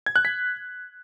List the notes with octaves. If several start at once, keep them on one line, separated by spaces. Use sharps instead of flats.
G#6
F#6
B6